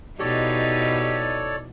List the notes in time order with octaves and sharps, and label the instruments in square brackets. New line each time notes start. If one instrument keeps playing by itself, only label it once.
[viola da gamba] B2 D#4 E4 [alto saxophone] G4 [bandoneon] A4 C#5 D5